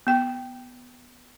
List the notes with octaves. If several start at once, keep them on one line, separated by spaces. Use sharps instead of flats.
B3 G5